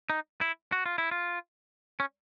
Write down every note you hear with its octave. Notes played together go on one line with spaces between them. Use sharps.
D#4
E4
F#4
F4
E4
F4
C#4